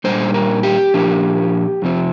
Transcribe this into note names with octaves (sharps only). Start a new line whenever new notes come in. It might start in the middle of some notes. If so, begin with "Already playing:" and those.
A#2 G3 A#3 D4 C5
A#4
G4
A#2 F3 A#3 D4
F2 C3 F3 C4